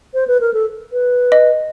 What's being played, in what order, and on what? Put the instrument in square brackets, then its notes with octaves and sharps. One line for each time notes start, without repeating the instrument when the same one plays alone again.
[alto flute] C5
B4
A#4
A4
B4
[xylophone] D#5